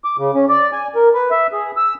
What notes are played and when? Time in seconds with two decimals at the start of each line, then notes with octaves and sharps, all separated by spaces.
0.04 D6
0.18 C#3
0.35 C#4
0.49 D5
0.73 G#5
0.95 A#4
1.14 B4
1.31 E5
1.53 G#4
1.77 E6